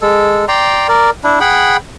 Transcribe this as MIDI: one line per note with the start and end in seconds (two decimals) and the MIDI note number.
0.01 0.45 56
0.01 0.45 69
0.48 0.87 74
0.48 0.87 79
0.48 0.87 82
0.48 0.87 84
0.88 1.10 70
0.88 1.10 74
1.24 1.39 62
1.24 1.39 64
1.40 1.77 68
1.40 1.77 78
1.40 1.77 79
1.40 1.77 83